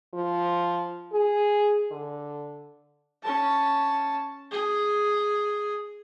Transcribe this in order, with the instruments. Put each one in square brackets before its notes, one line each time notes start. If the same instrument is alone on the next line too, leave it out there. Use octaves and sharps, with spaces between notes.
[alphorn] F3
G#4
D3
[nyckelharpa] C#4 A5
G#4